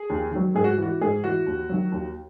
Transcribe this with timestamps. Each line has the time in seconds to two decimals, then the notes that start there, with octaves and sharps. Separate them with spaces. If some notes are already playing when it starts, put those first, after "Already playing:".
Already playing: G#4
0.10 D#2
0.32 D#3 F#3
0.54 G#2 G#4
0.64 F#4
0.77 E3 F#4
1.01 G#2 G#4
1.23 E3 F#4
1.46 D#2
1.69 D#3 F#3
1.92 D#2